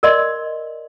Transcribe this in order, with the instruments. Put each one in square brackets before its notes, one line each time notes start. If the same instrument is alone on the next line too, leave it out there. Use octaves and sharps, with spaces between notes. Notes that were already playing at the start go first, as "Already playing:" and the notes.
[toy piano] A#4 D5 D#5 C6